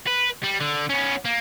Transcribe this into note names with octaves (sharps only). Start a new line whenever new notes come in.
B4
G3
D3
B3 C#4
A#3